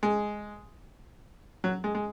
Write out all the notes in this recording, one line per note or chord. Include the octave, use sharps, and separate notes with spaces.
G#3
F#3
G#3
G#3